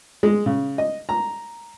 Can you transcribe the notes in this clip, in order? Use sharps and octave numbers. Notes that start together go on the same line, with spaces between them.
G#3
C#3
D#5
A#5